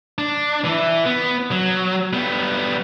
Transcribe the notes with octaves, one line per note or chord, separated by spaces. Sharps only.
D4
E3 E4
B3
F#3
G3 B3